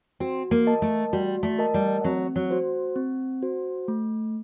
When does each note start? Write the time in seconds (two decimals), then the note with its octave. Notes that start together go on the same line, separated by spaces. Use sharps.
0.20 C4 F#4
0.51 A#3
0.67 A#4 D#5 A5
0.82 A3
1.13 G3 F#4
1.43 A3
1.58 A#4 D#5 A5
1.74 G3
2.04 F#3 C4
2.36 F#3
2.51 F#4 C5
2.96 C4
3.42 F#4 C5
3.88 A3